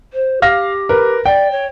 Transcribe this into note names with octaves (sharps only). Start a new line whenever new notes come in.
C5
G4 F5 F6 A#6
A#4 B4
D5 G5
C#5